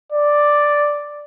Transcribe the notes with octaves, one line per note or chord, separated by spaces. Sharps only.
D5